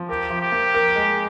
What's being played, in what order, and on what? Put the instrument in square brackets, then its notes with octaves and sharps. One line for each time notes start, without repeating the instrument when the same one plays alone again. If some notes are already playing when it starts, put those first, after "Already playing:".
Already playing: [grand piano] F3
[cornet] G4 [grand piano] A#4
[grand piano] F3
[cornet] G4
[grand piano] A#3
A#4
G#3